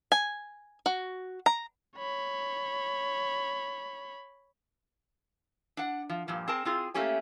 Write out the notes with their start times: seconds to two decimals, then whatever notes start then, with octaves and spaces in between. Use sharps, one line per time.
0.12 G#5
0.86 F#4
1.46 A#5
1.97 C#5 B5
5.77 D4 F#5
6.09 F3
6.28 G2 A#2 F3
6.48 C4 G#4 A#4 A5
6.65 C4 F4 G#4
6.94 A3 A#3 C#4 G4 G#5